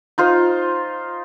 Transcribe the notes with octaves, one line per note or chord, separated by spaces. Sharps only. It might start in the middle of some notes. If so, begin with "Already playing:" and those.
D#4 F4 C5